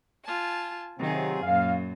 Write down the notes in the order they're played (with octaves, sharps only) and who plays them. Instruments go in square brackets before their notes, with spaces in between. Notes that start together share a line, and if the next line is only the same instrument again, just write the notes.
[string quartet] F4 G#5 A5
[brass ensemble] C3 F#3 C4 [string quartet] D#3 F4 G#4
[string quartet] F#2 A#2 [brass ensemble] F5